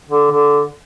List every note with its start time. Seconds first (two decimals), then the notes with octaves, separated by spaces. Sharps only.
0.09 D3
0.31 D3